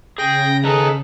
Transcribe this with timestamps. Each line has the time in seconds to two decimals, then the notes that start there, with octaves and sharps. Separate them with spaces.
0.18 C#3 G#4 G5 A#6
0.64 D#3 G#4 A4 B4 A#5